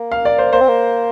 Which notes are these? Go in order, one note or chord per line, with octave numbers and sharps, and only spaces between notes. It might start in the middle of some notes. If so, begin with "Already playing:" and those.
Already playing: A#3
F5
D5
C5
A#3 C5
C4
A#3